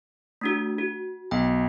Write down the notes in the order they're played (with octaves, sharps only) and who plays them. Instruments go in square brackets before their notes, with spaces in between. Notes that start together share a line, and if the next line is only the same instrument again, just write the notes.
[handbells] A3 D4 F#4
F#4
[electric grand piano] B1 [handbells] G5